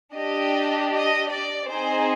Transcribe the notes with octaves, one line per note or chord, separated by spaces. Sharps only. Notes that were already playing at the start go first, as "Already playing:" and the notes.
D4 G4 D#5
D#5
D5
C4 D#4 G#4 C5